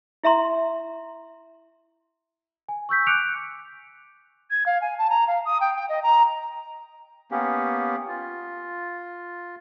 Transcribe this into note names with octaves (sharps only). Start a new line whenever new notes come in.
E4 E5 A#5 C6
G#5
C#6 E6 G6 B6
D6 F#6 G6 C#7 D7 F7
G#6
F5
G#5
A5
A#5
F5
D#6
G5
G5
D#5
A#5
A#3 B3 C#4 G4
F4